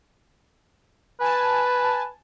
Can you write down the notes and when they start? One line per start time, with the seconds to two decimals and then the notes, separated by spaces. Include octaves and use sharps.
1.20 B4 G#5 A5